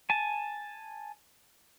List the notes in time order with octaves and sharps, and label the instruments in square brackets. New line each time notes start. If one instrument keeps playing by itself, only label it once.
[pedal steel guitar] G#5 A5